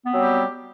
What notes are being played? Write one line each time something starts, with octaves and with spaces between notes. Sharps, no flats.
F#3 G3 B3 C4 G4